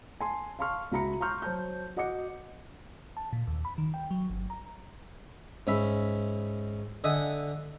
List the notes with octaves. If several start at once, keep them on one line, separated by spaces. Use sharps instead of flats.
G#5 A5 C6
F5 A5 C6 C#6 F6
C#2 F#4 E5 A#5 B5 C#7
A#5 C6 C#6 F6 G6
F#3 C5 A5 G6
F#4 D#5 F#5 D6 C#7
A5
A#2
D#2
B5
D#3
G5
F#3
G1
A#5
G#2 C#4 E5 B5
D3 D#5 E5 F#5 G#5 D#6